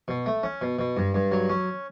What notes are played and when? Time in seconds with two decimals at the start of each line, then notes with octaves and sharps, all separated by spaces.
0.08 B2
0.26 A3
0.43 C#4
0.61 B2
0.79 B2
0.97 G2
1.14 G2
1.32 F#3
1.50 C#4